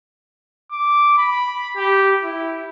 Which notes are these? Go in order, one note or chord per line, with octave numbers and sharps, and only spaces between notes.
D6
B5
G4
E4